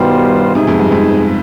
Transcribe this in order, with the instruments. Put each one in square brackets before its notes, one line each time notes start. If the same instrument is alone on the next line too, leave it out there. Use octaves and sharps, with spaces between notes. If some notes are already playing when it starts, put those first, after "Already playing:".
Already playing: [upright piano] G2 B2 [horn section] D#3 G3 B3 F4 C5
[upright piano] G#2 C3 [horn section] B3 D#4 G#4
[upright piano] F2 G#2
G2
F2 G#2